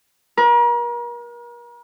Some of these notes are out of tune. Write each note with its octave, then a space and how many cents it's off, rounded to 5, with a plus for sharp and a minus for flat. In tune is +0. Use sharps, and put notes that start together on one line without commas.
A#4 +40